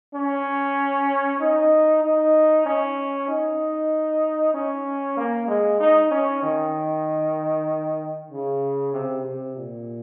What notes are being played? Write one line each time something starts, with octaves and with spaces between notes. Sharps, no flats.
C#4
D#4
D#4
C#4
D#4
C#4
A#3
G#3
D#4
C#4
D#3
C#3
C3
C3
A#2